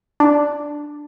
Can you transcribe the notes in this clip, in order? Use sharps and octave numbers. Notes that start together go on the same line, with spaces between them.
D4